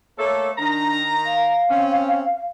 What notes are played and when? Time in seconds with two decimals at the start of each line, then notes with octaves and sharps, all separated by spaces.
0.18 A3 A#3 A4 C#5
0.58 D#3 D4 A#5
1.26 F5
1.69 C4 C#4